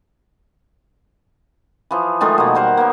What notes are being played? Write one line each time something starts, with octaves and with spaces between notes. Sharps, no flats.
E3 F3
D#3 F3 G#3 A3
B2 A#3
G3 A#4 C5 F#5
A#3 B3